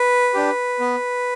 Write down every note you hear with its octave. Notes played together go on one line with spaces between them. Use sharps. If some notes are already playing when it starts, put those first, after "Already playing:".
Already playing: B4
D4 G4
B3